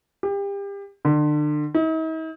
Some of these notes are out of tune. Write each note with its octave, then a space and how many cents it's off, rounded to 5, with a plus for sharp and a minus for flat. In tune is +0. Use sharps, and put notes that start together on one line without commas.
G4 +30
D3 +35
D#4 +45